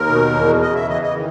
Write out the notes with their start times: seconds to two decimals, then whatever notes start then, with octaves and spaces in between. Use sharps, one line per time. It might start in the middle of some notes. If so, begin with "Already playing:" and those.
Already playing: D#2 A#4
0.08 B2
0.35 E2
0.62 C#3 D#5
0.75 E5
0.89 E3 D#5
1.02 D#5
1.15 D#3